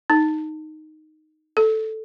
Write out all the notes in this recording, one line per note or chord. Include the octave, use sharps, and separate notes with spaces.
D#4
A4